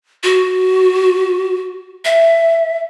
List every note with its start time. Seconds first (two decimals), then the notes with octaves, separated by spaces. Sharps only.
0.23 F#4
2.05 E5